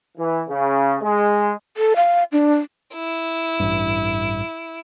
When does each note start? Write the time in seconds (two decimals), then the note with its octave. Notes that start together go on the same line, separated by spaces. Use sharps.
0.18 E3
0.49 C#3
1.02 G#3
1.77 A4
1.96 F5
2.32 D4
2.94 E4
3.60 A1 G2